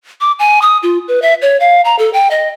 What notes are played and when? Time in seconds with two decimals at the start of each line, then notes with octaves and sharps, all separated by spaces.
0.21 D6
0.39 G#5
0.62 D#6
0.83 F4
1.08 B4
1.22 E5
1.42 C#5
1.60 F5
1.85 A#5
1.99 A4
2.13 G5
2.31 D#5